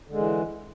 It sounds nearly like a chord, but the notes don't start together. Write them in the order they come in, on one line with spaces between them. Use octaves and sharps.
D3 G#3 E3